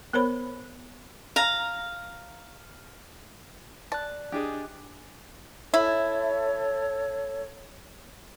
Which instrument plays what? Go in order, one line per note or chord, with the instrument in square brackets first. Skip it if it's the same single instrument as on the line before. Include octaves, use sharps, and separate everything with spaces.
[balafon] B3 A#4 C5 C#5 B5
[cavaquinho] F5 A#5
[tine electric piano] D5 F#6 [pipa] A5
[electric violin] D4 [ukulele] G4 G#4 D#5
[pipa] E4 [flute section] A4 C#5